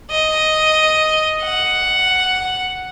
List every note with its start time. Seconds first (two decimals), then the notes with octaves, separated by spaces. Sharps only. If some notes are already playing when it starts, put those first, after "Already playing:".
0.11 D#5
1.43 F#5